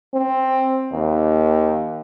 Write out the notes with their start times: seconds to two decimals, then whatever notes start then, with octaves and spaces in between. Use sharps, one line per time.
0.14 C4
0.92 D#2